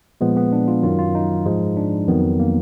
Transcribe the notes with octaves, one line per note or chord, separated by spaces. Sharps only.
A#2 F3 G#3 B3
B3
D4
F4
F#2 D#3 F#3 F4
F4
D#4
G#2 F3 G#3
D4
F2 D#3 F#3 B3
A#3